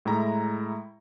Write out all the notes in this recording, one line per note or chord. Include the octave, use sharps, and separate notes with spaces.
A2 G#3 E4 A#5